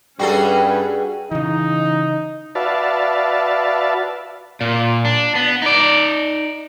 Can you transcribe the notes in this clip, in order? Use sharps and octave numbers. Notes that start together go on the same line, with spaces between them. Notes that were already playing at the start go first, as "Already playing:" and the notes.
G2 G3 C#4 F#4 G#4 A4 B4
C#3 E3 D#4
F#4 B4 D5 E5 F5 A5
A#2
D4
B3
D#4 D5